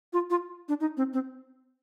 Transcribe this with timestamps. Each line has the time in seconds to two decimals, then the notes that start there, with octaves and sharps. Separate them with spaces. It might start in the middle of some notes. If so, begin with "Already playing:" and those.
0.13 F4
0.30 F4
0.69 D4
0.80 D#4
0.97 C4
1.13 C4